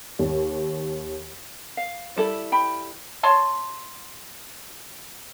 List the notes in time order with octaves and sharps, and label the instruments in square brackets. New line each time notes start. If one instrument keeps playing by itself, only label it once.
[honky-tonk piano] D#2
[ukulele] F5
[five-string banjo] G3 E4 A4
[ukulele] G5 B5
[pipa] C#5 A5 C6